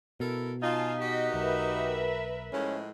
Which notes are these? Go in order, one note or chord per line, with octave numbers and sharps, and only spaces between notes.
B2 E4 A4 A#4
D#4 F4 F5 G#5 A5
F#4 G4 D#5 B6
B1 A#4 B4 E5
A2 F3 G#3 C#4